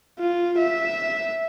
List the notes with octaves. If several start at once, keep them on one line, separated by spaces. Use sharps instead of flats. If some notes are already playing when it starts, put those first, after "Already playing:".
F4
E5